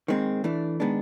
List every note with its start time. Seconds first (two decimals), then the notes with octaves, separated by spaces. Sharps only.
0.08 D#2 D#3 G#3 C4
0.44 E3 A3 D4
0.80 D#3 G#3 B3 D4